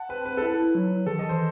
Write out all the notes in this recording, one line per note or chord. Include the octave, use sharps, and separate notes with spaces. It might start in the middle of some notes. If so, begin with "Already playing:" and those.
Already playing: F#5 A5
C4 B4
B4
A4
E4 B4
F#3
D#3 A4
E3 D#5
C5